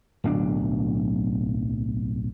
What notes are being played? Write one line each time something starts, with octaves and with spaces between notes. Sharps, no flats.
D1 B1 C#4 D4